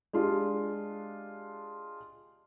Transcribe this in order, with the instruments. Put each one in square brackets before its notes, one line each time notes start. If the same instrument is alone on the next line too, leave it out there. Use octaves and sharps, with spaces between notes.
[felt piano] G#3 D4 F4 G4